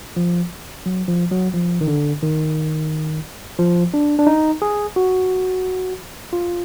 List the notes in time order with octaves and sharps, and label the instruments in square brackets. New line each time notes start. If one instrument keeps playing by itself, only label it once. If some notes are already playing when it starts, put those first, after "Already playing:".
[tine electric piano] F3
F#3
F3
F#3
F3
D#3
D3
D#3
F3
D4
D4
D#4
G#4
F#4
F4